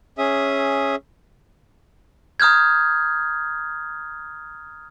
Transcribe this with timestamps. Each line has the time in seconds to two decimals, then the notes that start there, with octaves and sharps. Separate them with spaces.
0.18 C#4 G#4 E5 D#6
2.40 A#5 D#6 F6 G6 G#6